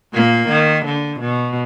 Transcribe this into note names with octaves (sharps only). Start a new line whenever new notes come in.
A#2 A#3
D#3
D3
B2